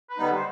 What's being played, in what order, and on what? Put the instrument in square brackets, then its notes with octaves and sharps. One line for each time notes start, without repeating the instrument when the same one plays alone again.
[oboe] B4
[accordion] D3 G3 B3 D#4
[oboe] C5